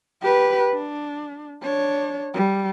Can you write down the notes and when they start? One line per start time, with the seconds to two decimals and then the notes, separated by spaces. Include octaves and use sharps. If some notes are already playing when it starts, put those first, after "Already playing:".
0.22 G4 B4
0.74 D4
1.63 D4 C#5
2.34 G3